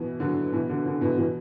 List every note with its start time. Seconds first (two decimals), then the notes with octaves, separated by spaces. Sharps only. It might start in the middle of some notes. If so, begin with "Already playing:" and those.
Already playing: B2 E3
0.20 D3 F#3
0.53 B2 E3
0.69 D3
0.86 D3
1.01 B2 E3
1.18 B2 E3